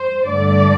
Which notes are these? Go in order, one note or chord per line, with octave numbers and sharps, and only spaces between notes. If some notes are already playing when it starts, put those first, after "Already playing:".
Already playing: C5
G2 D3 A3 D5